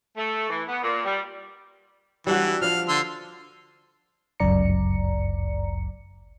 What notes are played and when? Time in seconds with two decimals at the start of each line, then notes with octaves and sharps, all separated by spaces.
0.17 A3
0.50 E3
0.69 B3
0.83 A#2
1.06 G3
2.27 E3 G3 D4 F#4
2.62 F3 D4 F5
2.89 D3 C6 E6
4.40 G1 C#2 F#2 D5 A#5 C#7